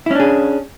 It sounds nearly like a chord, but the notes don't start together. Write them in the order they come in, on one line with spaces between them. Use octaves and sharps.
E4 C#4 D4 G#4